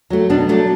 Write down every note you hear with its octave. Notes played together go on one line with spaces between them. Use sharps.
F#3 A3
B2 D4
F#3 A3 D4